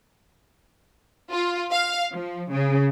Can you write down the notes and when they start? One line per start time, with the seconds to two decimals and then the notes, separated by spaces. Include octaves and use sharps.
1.32 F4
1.72 F5
2.13 F3
2.52 C#3